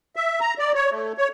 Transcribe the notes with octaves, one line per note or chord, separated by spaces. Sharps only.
E5
A#5
D5
C#5
A3
C#5